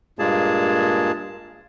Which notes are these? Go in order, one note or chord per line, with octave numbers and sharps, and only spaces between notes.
G2 A#2 G#3 A#3 G#4 A5